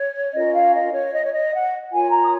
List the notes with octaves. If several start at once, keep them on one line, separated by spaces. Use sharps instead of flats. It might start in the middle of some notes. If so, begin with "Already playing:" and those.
Already playing: C#5
C#4 F4 A#4 D#5
F5
D#5
C#5
D#5
C#5
D#5
F#5
F4 A#4 C#5 G#5
A#5
D#6